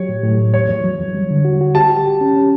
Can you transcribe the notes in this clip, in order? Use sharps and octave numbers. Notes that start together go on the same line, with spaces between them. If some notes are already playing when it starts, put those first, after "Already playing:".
Already playing: F#3 G4 C#5
A2
A2
A2
E2 C#5
E2
F#3
E2
G3
D3
F#4
F#4
G4 A5
G4
G4
C#4
C#4